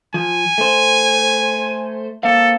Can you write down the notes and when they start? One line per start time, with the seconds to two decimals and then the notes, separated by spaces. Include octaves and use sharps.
0.14 F3 G#5
0.58 A3 C5
2.23 A#3 C4 A4 F5